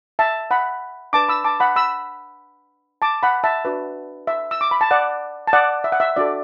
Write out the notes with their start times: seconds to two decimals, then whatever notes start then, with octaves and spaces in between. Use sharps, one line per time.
0.19 E5 A5
0.51 F#5 B5
1.13 D4 B4 A5 D6
1.29 B5 E6
1.44 A5 D6
1.60 F#5 B5
1.76 B5 E6
3.02 A5 D6
3.23 F#5 B5
3.44 E5 A5
3.65 D4 F#4 B4
4.27 E5
4.51 E6
4.61 D6
4.71 B5
4.81 A5
4.91 D5 F#5
5.47 A5
5.53 D5 F#5
5.84 E5
5.92 F#5
6.00 E5
6.16 D4 F#4 A4 D5